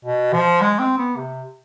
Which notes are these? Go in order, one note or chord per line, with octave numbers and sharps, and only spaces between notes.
B2
F3
G#3
C4
B3
C3